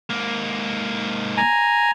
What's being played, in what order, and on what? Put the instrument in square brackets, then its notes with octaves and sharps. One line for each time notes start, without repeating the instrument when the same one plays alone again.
[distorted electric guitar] G#2 A#3
[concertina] G#5 A#5